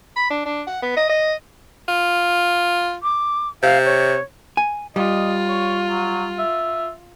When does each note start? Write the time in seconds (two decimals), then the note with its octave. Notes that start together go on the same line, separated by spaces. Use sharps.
0.16 B5
0.30 D4
0.46 D4
0.67 F#5
0.82 B3
0.97 D#5
1.09 D#5
1.88 F4
3.03 D6
3.63 C3 F5
3.85 C#5
4.57 G#5
4.96 G3 F4 D#5
5.49 C#5
5.89 F#3
6.39 E5